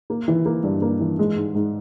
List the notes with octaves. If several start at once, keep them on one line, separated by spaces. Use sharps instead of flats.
A#3
E3
A#3
G2
A#3
E3
G#3
G#2
G#2